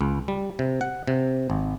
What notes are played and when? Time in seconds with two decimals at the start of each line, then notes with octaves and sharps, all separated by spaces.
0.01 C#2
0.28 G3
0.59 C3
0.81 F#5
1.07 C3
1.50 G#1